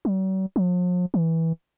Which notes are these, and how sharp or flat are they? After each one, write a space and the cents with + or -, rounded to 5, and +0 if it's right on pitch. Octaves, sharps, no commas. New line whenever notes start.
F#3 +45
F3 +45
E3 -15